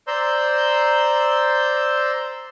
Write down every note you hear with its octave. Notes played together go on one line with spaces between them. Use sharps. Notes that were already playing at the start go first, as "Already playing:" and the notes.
C5 D5 A#5 C6 E6 G6